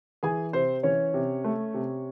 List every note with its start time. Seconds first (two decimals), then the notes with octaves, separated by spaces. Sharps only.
0.23 E3 G#4 G#5
0.53 C3 C4 C5
0.83 E3 C#4 C#5
1.14 C3
1.44 A3
1.74 C3